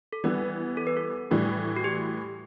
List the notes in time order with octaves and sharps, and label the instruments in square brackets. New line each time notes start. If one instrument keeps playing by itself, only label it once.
[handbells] A4
[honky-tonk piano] E3 G3 B3 [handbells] B4
[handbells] A4
B4
A4
[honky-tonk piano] A2 E3 G3
[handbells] F#4
G4